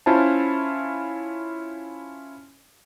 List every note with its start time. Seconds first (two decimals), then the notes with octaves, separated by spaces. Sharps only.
0.06 C#4 E4 F4 C5 A5